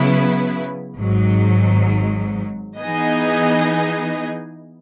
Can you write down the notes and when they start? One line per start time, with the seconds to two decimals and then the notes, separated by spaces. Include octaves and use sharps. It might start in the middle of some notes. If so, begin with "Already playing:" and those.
Already playing: C#3 F#3 B3 E4 B4
0.97 G#1 G#2 F#3
2.79 E3 B3 D#4 G#4 D#5